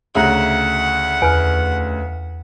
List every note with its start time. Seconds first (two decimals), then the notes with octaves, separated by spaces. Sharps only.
0.15 D2 C#3 E5 F#5 A#5
1.22 E2 B4 F6